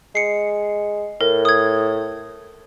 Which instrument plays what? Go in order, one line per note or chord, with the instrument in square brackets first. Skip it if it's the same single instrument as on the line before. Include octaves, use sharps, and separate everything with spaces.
[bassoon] G#3 [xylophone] C7 C#7
[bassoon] A2 [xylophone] A#4
[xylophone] D#6 G#6